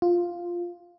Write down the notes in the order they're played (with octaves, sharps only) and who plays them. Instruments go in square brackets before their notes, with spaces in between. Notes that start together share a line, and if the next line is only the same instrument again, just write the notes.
[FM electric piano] F4